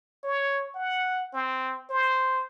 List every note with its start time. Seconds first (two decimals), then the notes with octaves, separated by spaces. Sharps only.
0.23 C#5
0.75 F#5
1.33 C4
1.90 C5